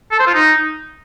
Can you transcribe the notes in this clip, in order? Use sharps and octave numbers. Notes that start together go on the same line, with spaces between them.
A4
C5
F4
D#4